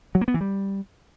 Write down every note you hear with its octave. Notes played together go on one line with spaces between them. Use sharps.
F#3
A#3
B3
E3
G3